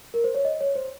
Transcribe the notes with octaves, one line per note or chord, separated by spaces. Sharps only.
A#4
C5
C#5
D#5
C#5
C5